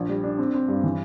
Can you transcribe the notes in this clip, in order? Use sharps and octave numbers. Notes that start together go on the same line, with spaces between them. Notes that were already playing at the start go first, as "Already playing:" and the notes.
Already playing: A#1
G3
D4
C4
C4
G2
E3